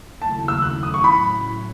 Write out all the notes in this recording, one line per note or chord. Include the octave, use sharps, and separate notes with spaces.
D#2 C#3 F#3 A3 E4 A5
E6
F#6
D#6
C#6
A2 F#3 C#4 E4 B5